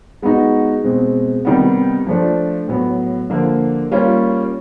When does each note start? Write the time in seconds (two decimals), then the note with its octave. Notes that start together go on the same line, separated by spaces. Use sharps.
0.22 G#3 B3 D#4 F#4
0.84 B2 G#3 C4
1.45 C3 D#3 G3 B3
2.07 F3 A3 D4
2.68 A2 F#3 B3
3.30 D3 F3 A#3
3.91 G3 A#3 C#4 F4